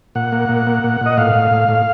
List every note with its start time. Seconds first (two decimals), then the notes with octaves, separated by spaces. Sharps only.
0.15 A#2 F#5
0.32 A#3
0.49 A#2
0.67 A#3
0.84 A#2
1.01 A#2 D#5
1.17 A2 F5
1.35 A2
1.51 A2
1.69 A2